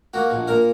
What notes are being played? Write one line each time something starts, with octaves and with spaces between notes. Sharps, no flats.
A#3 F#4
A#1
A#2 A#4